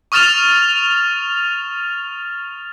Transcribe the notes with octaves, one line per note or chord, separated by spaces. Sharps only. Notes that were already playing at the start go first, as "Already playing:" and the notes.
C#6 D#6 F6 A6 E7 F7